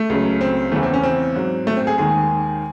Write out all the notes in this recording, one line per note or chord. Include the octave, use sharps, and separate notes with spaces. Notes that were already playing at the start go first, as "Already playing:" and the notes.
Already playing: A3
C#2 C#3 F#3
C4
E2 C#3 E3 A3
C4
C#4
C4
G#2 F#3
A3
C4
G#4
D#2 D#3 G#3 G#4